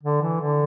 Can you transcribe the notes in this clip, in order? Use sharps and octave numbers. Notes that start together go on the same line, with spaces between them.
D3
E3
D3